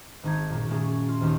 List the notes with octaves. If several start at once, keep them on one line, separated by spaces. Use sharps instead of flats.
G#1 D#4 G#6
F#2 A#2
A#2 A3 C#4 G#4
F4
G#1 D#2 A#3 D#4 F6